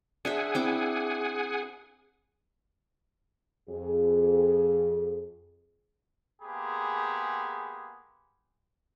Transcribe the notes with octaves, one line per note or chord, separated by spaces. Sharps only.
D4 G#4 C5 E5 F#5 G#5
C4 E4 D6
F2 G#4
G#3 A#3 B3 G4 G#4 B5